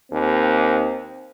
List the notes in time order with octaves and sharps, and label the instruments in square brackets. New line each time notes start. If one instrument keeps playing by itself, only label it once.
[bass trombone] D#2 [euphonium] C4